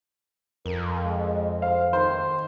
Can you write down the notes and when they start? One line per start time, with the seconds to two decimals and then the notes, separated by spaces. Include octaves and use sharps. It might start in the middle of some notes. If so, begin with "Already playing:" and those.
0.66 F2 A#4
1.05 G#3
1.62 C5 F5
1.93 D#3 C5